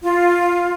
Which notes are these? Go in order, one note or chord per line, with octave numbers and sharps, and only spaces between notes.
F4